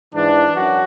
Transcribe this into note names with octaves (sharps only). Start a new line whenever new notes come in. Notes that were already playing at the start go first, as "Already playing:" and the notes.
G#2 E3 D4
F#2 F#4